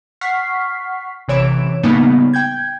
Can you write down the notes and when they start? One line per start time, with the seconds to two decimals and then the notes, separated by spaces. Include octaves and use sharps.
0.21 F#5 C#6 F6 B6 C7
1.28 A1 C3 E3 C#5 D7 E7
1.83 A2 C#3 G3 A#3 B3 D#4
2.33 G5 G6 G#6